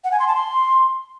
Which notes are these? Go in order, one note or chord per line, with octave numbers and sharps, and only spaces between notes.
F#5
G#5
C6
A5
C6